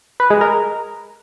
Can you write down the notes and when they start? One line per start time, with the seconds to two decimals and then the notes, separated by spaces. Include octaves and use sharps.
0.20 B4
0.30 G#3
0.41 A#4